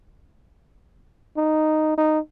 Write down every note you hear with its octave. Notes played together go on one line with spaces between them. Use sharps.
D#4
D#4